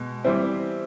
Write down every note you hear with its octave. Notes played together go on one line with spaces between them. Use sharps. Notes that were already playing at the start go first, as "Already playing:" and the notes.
Already playing: B2 G#3
E3 G3 C4 E4